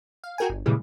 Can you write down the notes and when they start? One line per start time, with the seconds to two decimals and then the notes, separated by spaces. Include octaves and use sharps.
0.24 F5
0.38 F#4 G#4 A#4 G5 G#5
0.50 G1
0.66 F#2 A#2 C#3 E3 G3 G#3